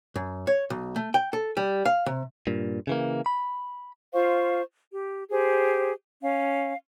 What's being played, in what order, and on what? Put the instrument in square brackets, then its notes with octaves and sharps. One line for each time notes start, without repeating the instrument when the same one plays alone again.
[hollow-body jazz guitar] F#2
C#5
B1
A3
G5
A4
G3
F5
C3
[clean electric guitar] G2 A#2
C#3 E3 A#3
B5
[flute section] F4 C5 F5 C#6
G4
G4 G#4 C5
C#4 F5